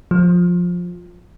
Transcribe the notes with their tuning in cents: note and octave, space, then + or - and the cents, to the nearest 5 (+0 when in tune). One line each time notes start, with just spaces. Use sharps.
F3 +15